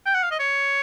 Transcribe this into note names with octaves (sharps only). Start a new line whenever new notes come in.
G5
F#5
F5
D#5
C#5